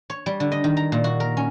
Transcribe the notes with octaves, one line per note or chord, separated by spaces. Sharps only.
C#5
G3
D3
D#5
D#3
A#5
A#2
F#4
A#4
C#4